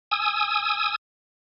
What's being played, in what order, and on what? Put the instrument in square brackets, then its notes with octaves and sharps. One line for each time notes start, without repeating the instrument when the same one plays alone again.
[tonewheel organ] G#5 D#6 E6